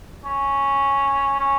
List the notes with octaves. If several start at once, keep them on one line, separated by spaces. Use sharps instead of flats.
C#4
C#4